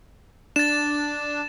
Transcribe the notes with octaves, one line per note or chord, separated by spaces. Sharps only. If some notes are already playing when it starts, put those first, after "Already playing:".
D4 A6 E7